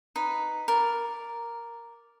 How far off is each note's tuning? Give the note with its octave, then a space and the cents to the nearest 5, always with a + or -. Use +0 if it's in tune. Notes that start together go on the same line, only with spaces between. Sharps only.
D#4 -5 B4 +0
A#4 +0 D5 +0